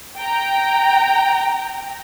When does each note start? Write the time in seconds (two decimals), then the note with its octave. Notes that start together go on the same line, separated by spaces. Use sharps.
0.18 G5 A#5